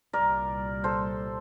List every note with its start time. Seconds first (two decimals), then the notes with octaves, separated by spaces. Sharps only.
0.13 C2 A#2 G3 A#4 D5
0.84 A4 C5